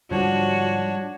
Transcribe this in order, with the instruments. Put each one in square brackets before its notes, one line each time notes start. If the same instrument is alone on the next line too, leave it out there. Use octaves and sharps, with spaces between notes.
[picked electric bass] G#2 D3 F3 [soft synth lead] G3 [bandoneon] D4 C#5 [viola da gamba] F#4